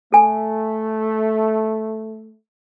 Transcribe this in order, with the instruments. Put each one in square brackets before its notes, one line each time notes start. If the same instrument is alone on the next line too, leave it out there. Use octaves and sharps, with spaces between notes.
[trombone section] A3 [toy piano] A4 G#5